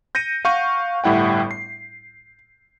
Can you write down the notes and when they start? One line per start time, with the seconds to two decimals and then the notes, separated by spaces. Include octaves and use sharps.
0.15 G6 A#6 C#7 D#7
0.45 F5 F#5 C#6 G6 D#7
1.04 G1 A2 G3 E4 F#5 G5
1.51 C7